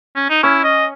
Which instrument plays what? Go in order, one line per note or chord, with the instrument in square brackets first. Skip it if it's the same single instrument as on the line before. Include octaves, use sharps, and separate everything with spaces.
[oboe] C#4
D#4
[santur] C#4 [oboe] E4
[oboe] D#5